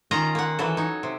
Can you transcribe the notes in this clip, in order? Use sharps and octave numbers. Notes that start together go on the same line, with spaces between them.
D#3 C#4 F4 D#5 A#5
A#3 F#5
E3 F#3 A4
D#4 C#5
C3